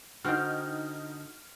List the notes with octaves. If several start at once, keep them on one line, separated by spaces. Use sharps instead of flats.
D3 D#4 F#4 C5 G5 F6